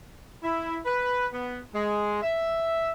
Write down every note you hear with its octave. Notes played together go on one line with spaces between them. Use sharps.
E4
B4
B3
G#3
E5